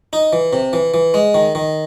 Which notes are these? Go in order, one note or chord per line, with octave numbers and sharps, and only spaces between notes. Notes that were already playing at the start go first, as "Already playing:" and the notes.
D#4
E3
C3
E3
E3
G#3
D#3
D#3